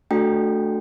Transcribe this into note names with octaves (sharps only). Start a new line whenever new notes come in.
A3 D4 F#4 A4 G5